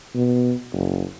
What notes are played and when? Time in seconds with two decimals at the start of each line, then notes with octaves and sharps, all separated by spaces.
0.15 B2
0.73 F#1